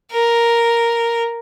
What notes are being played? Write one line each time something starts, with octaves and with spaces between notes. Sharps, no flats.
A#4